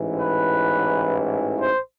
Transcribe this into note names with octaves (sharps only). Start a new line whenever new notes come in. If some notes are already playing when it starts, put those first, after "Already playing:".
Already playing: A1 G#2 E3
B4
C5